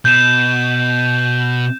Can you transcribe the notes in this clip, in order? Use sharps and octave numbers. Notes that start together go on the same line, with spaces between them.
B2 G6 E7